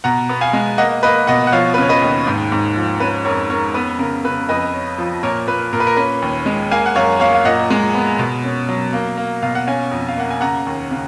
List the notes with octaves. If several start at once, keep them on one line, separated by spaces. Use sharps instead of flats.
B2 F#5 A#5
B3
F5 G#5
G#3
A#3 D#5 F#5
A#3 B4 D#5
B2 D#5 F#5
F#5
F3 C#5 F5
B4
C#3 C#5
B4 D#5
D#2
G#2
G#2
F3
C#4 B4
F2 A#4 C#5
C#4 A#4 C#5
B3 B4
C#3 A#4
C#3 B4
F2 B4 D#5
C#4
F3
A#2 A#4 C#5
A#2 B4
A#2 A#4
B4
A#4
C#4 B4
D#2
G#3
A#3 F5 G#5
F#5
F#2 C#5 F5
A#3 C#5 F5
F5
A#2 D#5 F#5
G#3
B3
B2
C#4
F#3
A#3
A#3
B2 F5
F#5
C#4 F5 G#5
F2
F5
A#3 F#5
G#5
C#3 F#5 A#5
D#2
C#3